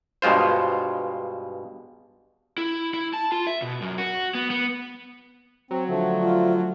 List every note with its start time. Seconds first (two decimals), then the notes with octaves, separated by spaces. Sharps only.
0.22 G2 B2 G#3 F4 C5
2.58 E4
2.94 E4
3.13 A5
3.32 F4
3.47 E5
3.62 B2
3.82 F#2
3.98 F#4
4.35 B3
4.50 B3
5.71 F#3 C4
5.88 D3 F3 A3
6.22 F4